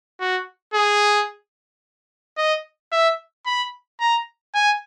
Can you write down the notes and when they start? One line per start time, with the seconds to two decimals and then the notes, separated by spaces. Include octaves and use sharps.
0.20 F#4
0.74 G#4
2.37 D#5
2.92 E5
3.46 B5
4.00 A#5
4.55 G#5